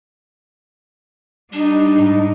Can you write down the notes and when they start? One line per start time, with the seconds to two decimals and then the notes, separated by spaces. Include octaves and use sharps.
1.53 G3 D4 D#4
1.95 G#2